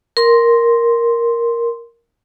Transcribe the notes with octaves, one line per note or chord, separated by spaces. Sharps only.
A#4 C6